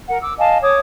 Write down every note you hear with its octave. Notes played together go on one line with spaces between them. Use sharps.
A#4 F#5
D6 E6
D#5 F5 G#5 A5
C#5 D6 D#6